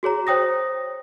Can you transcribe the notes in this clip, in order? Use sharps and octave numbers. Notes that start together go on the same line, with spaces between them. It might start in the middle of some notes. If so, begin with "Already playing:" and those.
F#4 G#4 C#5 A#5
C5 C#5 G5 D#6 A#6